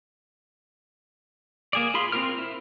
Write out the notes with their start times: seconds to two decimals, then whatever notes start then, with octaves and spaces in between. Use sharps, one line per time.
1.73 A#3 G#4 D5
1.94 F4 G#4 B5 C6
2.12 C4 D4 F4 A#4 F6
2.38 E4